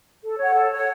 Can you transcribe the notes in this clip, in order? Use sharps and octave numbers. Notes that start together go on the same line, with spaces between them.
A4
C#5 F#5
A4
C#5 F#5